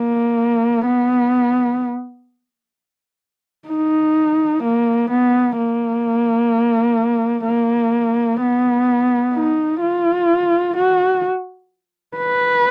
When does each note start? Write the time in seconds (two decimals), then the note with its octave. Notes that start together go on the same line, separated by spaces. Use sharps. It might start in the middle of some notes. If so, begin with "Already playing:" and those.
Already playing: A#3
0.86 B3
3.68 D#4
4.63 A#3
5.10 B3
5.57 A#3
7.46 A#3
8.41 B3
9.34 D#4
9.82 F4
10.76 F#4
12.17 B4